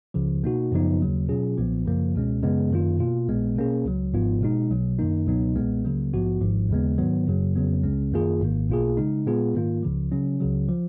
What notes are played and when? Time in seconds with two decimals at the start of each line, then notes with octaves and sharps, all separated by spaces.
0.14 C#2 C#3 F3
0.44 B2 A#3 D#4 F#4
0.72 F#2 C#3 F3 B3 D#4
1.01 D#2 C#3 F#3 A#3
1.28 B2 F#3 C#4 F4 G#4
1.57 B1 A#2 F3 B3
1.86 F#2 C#3 F3 A#3
2.14 C#2 B2 G#3 C#4
2.43 F#2 C#3 G#3 B3
2.71 F#2 D#3 A#3 F4
2.99 B2 A#3 F4
3.28 A#1 A#2 G#3 B3
3.56 B2 A#3 C#4 G#4
3.85 C#2 C#3 F#3
4.14 G#1 G#2 F3 B3 F4
4.41 B2 G#3 D#4
4.70 B1 B2 F#3
4.99 F#2 D#3 A#3 D#4
5.27 C#2 B2 F#3 B3 D#4
5.56 B1 A#2 G#3 B3
5.85 C#2 C#3 F#3 A#3
6.13 A#1 G#2 F3 B3 F#4
6.41 G#1 G#2 F3
6.69 D#2 C#3 G#3 B3
6.98 G#2 D#3 F#3 B3
7.27 F#2 C#3 F#3 A#3
7.55 F2 C#3 F#3 B3
7.83 C#2 C#3 G#3 C#4
8.12 F#2 D#3 A#3 F4 G#4
8.41 G#1 G#2 D#3 A#3
8.69 B1 B2 A#3 F4 G#4
8.97 C#3 G#3 D#4
9.26 A#2 G#3 B3 F4 G#4
9.54 G#2 D#3 A#3 F4
9.83 C#2 C#3 F3
10.11 C#3 F#3 C#4
10.40 C#2 C#3 F#3
10.68 F3